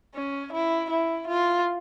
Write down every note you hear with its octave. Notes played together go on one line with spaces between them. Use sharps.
C#4
E4
E4
F4